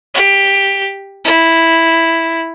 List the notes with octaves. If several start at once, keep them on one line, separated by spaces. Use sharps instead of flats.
G4
E4